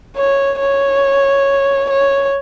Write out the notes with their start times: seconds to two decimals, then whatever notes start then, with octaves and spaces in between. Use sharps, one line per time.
0.17 C#5
0.60 C#5
1.90 C#5